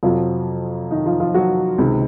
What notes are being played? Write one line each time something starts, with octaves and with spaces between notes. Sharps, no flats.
F2 C3 F3 F#3 F4
D#3 D#4
F3 F4
F3 F4
F#3 F#4
C#2 C3 D#3